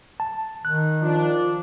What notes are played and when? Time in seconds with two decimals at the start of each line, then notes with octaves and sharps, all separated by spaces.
0.20 A5
0.65 D#3 F#6
1.01 F3 D4